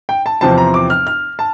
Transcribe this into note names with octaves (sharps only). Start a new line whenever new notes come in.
G5
A5
E2 C3 F3 C4 A5
A#5
D6
F6
F6
A5